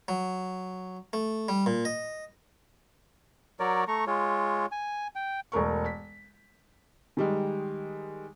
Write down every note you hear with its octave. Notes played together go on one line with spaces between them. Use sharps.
F#3
A3
G3
A#2
D#5
F#3 A#4 C#5 D5
A3 A#5 C#6
G#3 F4 C#5
G#5
G5
E1 A3 A#4 C#6
B6
D#3 G3 G#3